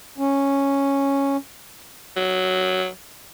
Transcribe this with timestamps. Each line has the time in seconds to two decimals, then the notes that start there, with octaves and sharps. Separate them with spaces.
0.18 C#4
2.16 F#3